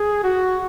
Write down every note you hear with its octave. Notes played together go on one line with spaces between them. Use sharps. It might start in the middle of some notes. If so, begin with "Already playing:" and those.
Already playing: G#4
F#4